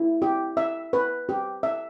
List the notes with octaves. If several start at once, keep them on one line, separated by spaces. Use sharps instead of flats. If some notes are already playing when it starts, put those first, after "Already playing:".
Already playing: E4
G4
E5
B4
G4
E5